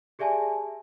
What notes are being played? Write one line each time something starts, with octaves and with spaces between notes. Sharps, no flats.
G4 G#4 D5 E5 G#5 A5